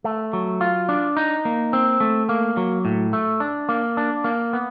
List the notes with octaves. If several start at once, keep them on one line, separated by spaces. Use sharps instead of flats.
A3
F#3
F4
D4
D#4
A#3
C4
A3
A#3
F#3
A2
A3
D4
A#3
D4
A#3
B3